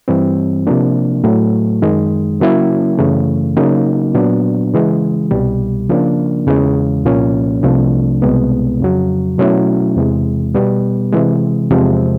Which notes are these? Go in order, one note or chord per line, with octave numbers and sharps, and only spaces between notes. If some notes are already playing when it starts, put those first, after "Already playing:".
G2 E3 G3 C4
C3 F3 A#3 D4
A2 F#3 A3
F#2 D#3 G#3
C#3 F#3 A#3 C#4 E4
F#2 C#3 E3 A3
C#3 F#3 A#3 D#4
A#2 F#3 B3 D4
C#3 E3 G#3
C2 B2 G3
C#3 F3 A#3 D4
E2 C#3 E3 G#3
C2 A#2 F3 A#3 C#4
C2 C3 F3 A3 D4
C2 B2 G#3 B3
F2 C#3 F#3
B2 F#3 A3 C#4 E4
E2 C3 E3 G#3
B2 G3 B3
C3 E3 G#3
E2 C3 F3 G#3 C4